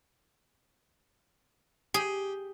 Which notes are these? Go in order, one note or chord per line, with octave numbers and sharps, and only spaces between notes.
G4 G#4